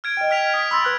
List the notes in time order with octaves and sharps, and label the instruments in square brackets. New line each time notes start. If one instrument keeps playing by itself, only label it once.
[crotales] F6 G#6 D7
[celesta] D#5 G5
[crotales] F6 B6 F7
[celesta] D#6 [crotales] B6 D7
[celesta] B5 C6 A6 [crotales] E6
[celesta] B4 F6 F#6